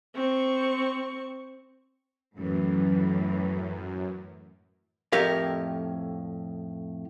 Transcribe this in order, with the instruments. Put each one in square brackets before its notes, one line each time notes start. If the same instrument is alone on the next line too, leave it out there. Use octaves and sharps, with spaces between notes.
[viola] C4 C#6
[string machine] F#2 [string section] A2 E3
[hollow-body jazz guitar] F2 A2 G4 A#4 F5